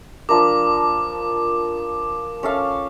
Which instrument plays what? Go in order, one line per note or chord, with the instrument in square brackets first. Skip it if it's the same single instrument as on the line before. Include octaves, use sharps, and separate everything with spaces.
[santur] F3 D4 A#4 [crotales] D6
[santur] C#4 A4 F5